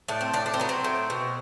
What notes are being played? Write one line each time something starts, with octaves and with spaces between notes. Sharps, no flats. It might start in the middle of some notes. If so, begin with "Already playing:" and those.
A2 D4
C4
A2 D4
D4
C4
F#3 B3
C4
A2
B2